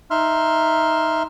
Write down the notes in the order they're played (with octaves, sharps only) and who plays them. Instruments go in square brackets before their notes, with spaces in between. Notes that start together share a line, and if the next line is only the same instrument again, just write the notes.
[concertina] D#4 E5 C6 F6